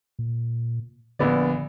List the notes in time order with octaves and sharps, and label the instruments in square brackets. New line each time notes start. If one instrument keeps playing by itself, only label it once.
[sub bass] A#2
[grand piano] A#1 B3 D5 [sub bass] D3